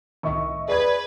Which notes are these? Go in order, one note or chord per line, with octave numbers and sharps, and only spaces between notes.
C2 A2 D#3 D#5 E5 C#6
G#4 B4 D5 G#6